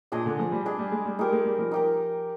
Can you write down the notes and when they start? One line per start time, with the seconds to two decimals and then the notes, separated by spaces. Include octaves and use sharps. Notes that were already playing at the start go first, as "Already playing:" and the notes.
0.12 A#2 D4 G#4 D#5
0.26 D3
0.39 F3
0.52 G3
0.66 D4 G#4 D#5
0.79 G3
0.92 G#3
1.06 G3
1.19 G#3 D#4 G4 A#4
1.32 G#3
1.45 G3
1.59 F3
1.72 D#4 G4 A#4